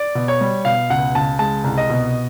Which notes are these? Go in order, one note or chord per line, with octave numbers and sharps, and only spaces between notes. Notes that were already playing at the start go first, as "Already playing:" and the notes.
Already playing: D5
B2
C#5
G3
B2 F5
C#2 F#5
C#2 A5
G#3 A5
C2
D#5
B2